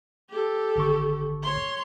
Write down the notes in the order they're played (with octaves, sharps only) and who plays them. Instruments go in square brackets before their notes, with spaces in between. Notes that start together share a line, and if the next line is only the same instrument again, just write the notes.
[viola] G4 A4
[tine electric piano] G#1 D3 C#6
[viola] C#5 C6